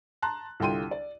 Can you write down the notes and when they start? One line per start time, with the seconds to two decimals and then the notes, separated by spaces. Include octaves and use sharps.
0.22 A5 A#5 C6 F#6
0.60 C2 D3 F4 G5 C6 D#7
0.91 D5